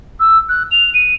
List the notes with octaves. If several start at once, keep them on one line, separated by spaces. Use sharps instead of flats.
E6
F#6
F7
D#7